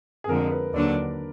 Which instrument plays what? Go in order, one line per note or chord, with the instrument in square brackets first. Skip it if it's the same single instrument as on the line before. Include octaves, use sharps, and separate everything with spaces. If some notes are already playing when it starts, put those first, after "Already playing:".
[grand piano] G#4
[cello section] F2 D3 G#3 [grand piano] A#4
[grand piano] B4
[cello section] D#2 D3 F#3 D4 [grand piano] D5